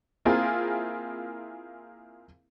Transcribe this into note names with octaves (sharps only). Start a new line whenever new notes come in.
A#3 C4 E4 F4 G#4 A#4